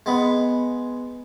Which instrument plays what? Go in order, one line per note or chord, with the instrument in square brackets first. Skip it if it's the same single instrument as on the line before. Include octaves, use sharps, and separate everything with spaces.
[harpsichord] G#3 B3